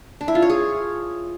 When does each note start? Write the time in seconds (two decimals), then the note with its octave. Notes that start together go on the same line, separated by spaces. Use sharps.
0.21 D4
0.28 E4
0.35 F4
0.42 C#5
0.50 G#4